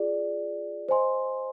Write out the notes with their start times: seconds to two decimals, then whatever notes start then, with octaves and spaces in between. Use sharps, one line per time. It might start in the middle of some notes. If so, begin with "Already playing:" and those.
Already playing: F4 G#4 D5
0.89 C5 D#5 G#5 C6